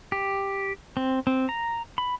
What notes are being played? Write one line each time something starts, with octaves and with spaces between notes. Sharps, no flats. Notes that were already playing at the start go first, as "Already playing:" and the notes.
G4
C4
C4
A#5
B5